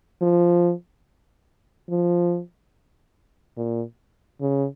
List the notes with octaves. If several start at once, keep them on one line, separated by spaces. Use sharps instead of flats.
F3
F3
A#2
C#3